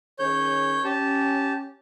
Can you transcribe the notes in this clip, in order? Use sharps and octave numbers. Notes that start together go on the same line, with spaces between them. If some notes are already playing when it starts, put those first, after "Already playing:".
D#3 C#4 G#4 C#5 G6
C#4 G4 A5